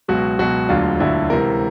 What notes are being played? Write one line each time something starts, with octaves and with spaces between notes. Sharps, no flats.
C#2 B2 F#3 F#4
C#2 B2 F#3 F#4
E1 D2 D3 F#3 F4
E1 D2 D3 F#3 E4
C#2 C3 E3 A#4